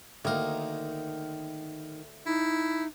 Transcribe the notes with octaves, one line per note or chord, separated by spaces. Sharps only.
D2 D#3 A#3 A#4
D#4 E4